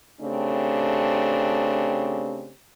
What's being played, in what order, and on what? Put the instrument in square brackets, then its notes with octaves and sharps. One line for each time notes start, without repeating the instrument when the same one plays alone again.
[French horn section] C#3 A3 C4 D4 G4